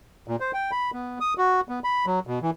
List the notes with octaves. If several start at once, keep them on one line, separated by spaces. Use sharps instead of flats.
A#2
C5
G5
B5
B3
D#6
F#4
B3
B5
F#3
B2
E3